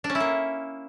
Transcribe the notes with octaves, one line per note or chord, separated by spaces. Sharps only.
D4
C#4
E4
A#3